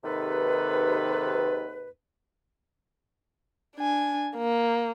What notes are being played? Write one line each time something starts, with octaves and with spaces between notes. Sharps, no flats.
D#2 G#2 C3 D#3 A4 B4
D4 G#5
A#3